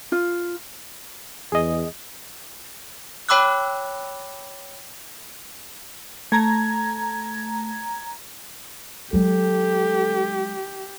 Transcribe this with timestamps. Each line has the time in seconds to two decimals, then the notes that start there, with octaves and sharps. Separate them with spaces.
0.12 F4
1.52 E2 G#4 D#5
3.29 C#5 G5 B5 D6 E6 F#6
6.32 A3 A#5 G#6
9.13 F#3 G#3 G4 A4